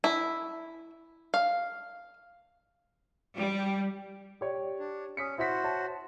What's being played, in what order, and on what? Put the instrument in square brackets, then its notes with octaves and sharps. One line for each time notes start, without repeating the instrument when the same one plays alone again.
[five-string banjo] E4
F5
[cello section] G3
[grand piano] G4 C#5 D5
[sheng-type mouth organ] D4
[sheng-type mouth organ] C#4 [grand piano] D#6 B6 C#7
[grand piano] E4 B6 [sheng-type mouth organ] F#4 C5
[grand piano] C#5 A5